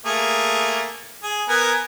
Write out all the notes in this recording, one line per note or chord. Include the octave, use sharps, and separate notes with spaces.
A3 A#3 G#4
G#4
B3 A#4 G#5